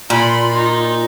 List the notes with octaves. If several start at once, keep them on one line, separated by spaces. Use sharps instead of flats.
A#2 F4 B5 C6
D#4